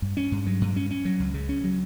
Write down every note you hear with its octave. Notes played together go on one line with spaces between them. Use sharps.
G2
C#4
G2
F#3
G2
C#4
C#4
F#3
C#2
C#3
C#4
F#3